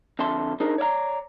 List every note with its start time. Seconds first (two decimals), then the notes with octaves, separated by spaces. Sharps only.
0.19 F2 D3 E5 A5 C6
0.60 D4 D#4 G#4 A#4 C5 D#5
0.78 C#5 D5 E5 A#5